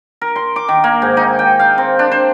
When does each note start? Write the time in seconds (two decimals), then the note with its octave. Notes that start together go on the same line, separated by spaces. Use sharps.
0.21 A#4
0.36 C6
0.56 D6
0.68 D#3
0.84 A#3
1.02 G#2
1.17 D#4
1.39 G5
1.59 F5
1.78 C4
1.99 D4
2.12 C5